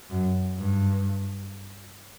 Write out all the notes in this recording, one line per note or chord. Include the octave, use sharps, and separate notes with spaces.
F#2
G2